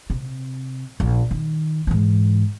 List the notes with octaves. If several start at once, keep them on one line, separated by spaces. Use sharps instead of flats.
C3
A#1
D#3
G#2 E3